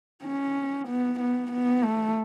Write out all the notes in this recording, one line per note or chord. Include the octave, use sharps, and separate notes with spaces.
C#4
B3
B3
B3
A3